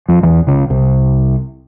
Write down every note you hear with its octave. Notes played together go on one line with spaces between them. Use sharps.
F2 F3
E2 E3
C#2 C#3
C2 C3